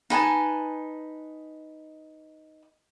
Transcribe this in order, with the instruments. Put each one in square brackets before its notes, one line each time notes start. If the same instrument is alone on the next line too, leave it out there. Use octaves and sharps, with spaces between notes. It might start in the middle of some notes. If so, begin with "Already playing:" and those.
[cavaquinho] D#4 B4 G#5 A5